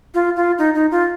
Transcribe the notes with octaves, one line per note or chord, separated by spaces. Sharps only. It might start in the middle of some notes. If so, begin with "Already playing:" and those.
F4
F4
D#4
D#4
F4